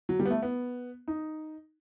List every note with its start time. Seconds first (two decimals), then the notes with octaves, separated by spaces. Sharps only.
0.09 F#3
0.20 G3
0.25 B3
0.30 A3
0.42 B3
1.08 D#4